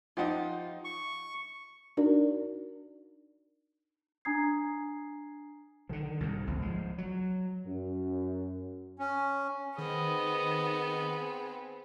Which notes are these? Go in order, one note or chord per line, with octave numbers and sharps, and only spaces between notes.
F3 D#4 F4 G4 F#5
C#6
D4 D#4 F#4 A#4 D5
D4 G#5 A#5 D#6 G#6 C7
D3 D#3 F3
C2 G#2
G1 C#2 A2 F3
F3 G#3
F#3
F#2
C#4
D#3 B3 C4 G#4 D#5